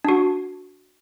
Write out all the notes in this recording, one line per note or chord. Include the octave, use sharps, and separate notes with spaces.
D4 F#4